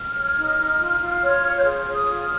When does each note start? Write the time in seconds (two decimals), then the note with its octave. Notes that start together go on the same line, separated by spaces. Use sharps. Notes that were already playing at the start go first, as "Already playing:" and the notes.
Already playing: F6
0.14 C#5
0.35 D#4
0.56 D#4
0.78 F4
0.99 F4
1.21 C#5
1.42 F4
1.58 G6
1.64 G#4 F6
1.85 G#4
1.93 D#6
2.06 F4
2.21 F6